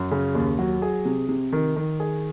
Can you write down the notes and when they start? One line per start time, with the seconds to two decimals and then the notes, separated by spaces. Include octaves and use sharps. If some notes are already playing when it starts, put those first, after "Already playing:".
Already playing: F#2
0.11 C#3
0.35 D#2
0.59 F#3
0.82 G#4
1.05 C3
1.29 C3
1.52 D#3
1.76 D#3
2.00 G#4